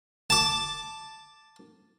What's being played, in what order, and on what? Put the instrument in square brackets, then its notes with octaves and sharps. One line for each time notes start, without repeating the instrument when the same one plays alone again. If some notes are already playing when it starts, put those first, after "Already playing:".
[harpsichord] A5 D6